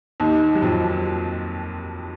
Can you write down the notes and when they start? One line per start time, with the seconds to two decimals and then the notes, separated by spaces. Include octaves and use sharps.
0.20 D#2 D#3
0.55 F#3
0.62 F2 F3